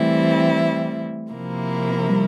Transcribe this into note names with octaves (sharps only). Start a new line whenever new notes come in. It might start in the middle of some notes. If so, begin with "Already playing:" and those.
Already playing: E3 G3 A3 C4 E4
C3 F3 A#3 E4 A#4
G3